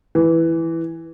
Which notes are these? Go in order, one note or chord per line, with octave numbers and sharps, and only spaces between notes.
E3